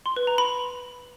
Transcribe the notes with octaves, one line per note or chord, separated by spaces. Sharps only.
C6
B4
A#5
B5